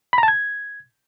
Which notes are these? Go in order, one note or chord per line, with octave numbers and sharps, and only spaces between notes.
B5
A#5
A5
G#6